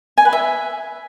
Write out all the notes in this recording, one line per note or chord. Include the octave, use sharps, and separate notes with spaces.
G#5
B4
E5